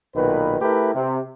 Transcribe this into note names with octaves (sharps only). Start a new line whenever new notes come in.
B1 A#2 D#3 B4
A3 E4 G4 A#4 B4
C3